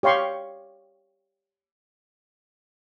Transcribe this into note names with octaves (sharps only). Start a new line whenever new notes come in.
G4 C#5 F5 C6 C#6